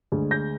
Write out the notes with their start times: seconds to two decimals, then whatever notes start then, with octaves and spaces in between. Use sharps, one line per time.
0.12 D2 D3 G#3
0.31 G6 A#6